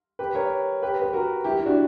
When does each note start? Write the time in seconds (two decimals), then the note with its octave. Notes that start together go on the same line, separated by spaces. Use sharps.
0.19 G4 B4
0.34 A#4 C#5
0.83 G4 B4
1.02 B4
1.13 F#4 A#4
1.44 E4 G4
1.58 E4
1.66 D4 F#4